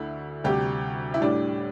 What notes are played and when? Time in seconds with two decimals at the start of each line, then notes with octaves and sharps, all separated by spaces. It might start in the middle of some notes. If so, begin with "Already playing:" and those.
Already playing: D2 D3 A3 E4
0.44 D2 C3 G3 G4
1.14 E4
1.21 A2 G3 D4